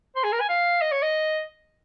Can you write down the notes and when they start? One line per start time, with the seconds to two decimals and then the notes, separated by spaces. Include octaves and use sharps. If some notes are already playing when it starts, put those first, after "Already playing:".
0.16 C5
0.24 G#4
0.32 A#4
0.40 G#5
0.49 F5
0.82 D#5
0.92 C#5
1.03 D#5